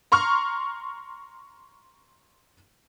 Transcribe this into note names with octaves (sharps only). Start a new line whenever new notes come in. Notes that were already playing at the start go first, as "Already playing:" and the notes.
A#5 C6 C#6 F6